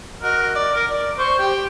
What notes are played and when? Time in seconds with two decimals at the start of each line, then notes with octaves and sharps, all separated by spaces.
0.23 F#4 A#4 D#5
0.55 D5
0.75 A#4
0.90 D5
1.18 C5 C#6
1.39 G4 G5